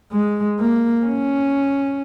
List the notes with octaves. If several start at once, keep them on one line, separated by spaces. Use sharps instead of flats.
G#3
A#3
C#4